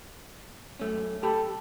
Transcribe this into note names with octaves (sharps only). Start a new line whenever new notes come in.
F#2 A3 C#4
G4 A4 B5